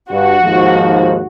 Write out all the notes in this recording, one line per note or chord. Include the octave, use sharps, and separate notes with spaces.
G2 F#4
D#2 G#2 F3